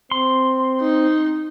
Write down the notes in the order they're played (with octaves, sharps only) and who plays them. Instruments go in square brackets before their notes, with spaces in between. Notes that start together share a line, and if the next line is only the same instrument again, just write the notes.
[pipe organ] C4 [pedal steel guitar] C6
[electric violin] D#4